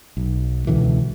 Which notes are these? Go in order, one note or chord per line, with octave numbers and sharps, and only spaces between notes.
B1
C#2 B2 D3 E3